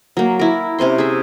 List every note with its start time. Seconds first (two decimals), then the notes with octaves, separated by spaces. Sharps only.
0.17 F#3 A#3
0.39 E4 A#4
0.79 C3 C#4 C5 C6
0.98 G#4 E5